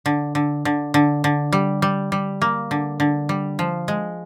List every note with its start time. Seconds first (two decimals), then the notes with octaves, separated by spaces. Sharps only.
0.06 D3
0.35 D3
0.65 D3
0.94 D3
1.24 D3
1.52 G3
1.82 G3
2.12 G3
2.42 A#3
2.71 D3
3.00 D3
3.29 G3
3.59 F3
3.88 G#3